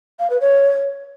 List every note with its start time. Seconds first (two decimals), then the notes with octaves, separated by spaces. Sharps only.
0.19 F5
0.30 B4
0.41 C#5